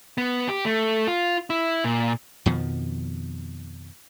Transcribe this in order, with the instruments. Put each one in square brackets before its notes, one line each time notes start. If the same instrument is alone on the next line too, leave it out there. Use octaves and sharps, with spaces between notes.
[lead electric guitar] B3
G4
A3
F4
E4
A#2
[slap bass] F2 B2 D#3 F3